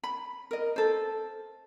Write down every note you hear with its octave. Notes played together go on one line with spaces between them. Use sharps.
B5
A#4 D#5
A4 C5